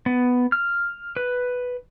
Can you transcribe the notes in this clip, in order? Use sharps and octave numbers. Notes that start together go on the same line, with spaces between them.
B3
F6
B4